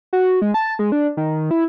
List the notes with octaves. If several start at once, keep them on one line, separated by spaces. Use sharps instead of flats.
F#4
G#3
A5
G#3
D4
D#3
E4